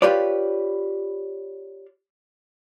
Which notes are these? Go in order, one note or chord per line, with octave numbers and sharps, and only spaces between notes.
F4 G4 B4 C#5 D5